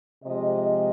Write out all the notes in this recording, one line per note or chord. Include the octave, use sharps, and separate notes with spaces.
C3 F3 G#3 D#5